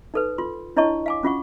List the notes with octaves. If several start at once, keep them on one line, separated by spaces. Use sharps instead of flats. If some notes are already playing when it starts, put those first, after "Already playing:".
D#4 A4 B4
F4 C6
D4 E4 C#5 D#5 A5 C#6
F5 G#5 D6
C#4 F4 F#5 C#6